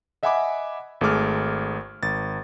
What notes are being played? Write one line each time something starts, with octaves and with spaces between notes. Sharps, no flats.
D#5 E5 F#5 G#5 B5 D6
G#1 A3 G#4 D6 F6
G#1 A6